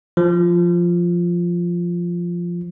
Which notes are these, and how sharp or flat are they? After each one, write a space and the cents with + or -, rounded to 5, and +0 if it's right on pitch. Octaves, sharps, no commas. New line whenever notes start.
F3 -5